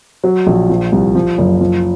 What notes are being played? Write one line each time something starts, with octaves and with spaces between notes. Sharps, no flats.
F#3
A#1
F3
C2
F3
F#1
F3